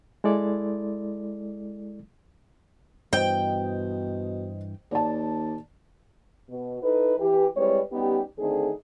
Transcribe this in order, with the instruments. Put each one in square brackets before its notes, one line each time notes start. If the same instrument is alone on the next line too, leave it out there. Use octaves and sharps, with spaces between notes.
[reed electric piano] G#3 E4 A4 D5
[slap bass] G2 E3 [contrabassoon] B2 [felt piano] C5 D#5 [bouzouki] G5
[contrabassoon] D#2 [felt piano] D5 A5
[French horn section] B2
D#4 E4 A4 B4
E3 G4
G3 G#3 C4 E4 B4 C#5
G3 B3 C#4 D#4 G4
D3 D#3 A3 C4 D#4 G#4